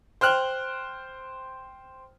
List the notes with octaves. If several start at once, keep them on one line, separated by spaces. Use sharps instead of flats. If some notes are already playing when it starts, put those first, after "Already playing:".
C5 G5 F6 F#6